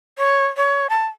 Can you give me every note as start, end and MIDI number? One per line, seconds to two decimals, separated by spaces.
0.18 0.46 73
0.57 0.87 73
0.90 1.06 81